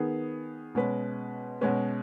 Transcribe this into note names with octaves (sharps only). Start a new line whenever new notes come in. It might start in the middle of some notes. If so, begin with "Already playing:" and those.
Already playing: D#3 B3 G#4
B2 G#3 C#4 B4
B2 G#3 C#4 B4